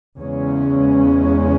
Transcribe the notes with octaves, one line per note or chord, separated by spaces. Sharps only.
E2 C#3 G#3 C#4